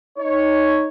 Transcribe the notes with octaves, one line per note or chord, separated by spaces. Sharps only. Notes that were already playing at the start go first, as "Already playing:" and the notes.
D#4 C#5